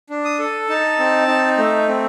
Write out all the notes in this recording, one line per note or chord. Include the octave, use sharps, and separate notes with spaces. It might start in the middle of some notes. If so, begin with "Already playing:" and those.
D4
D#6
A4
D#4 A5
C4
D#4
A3
C4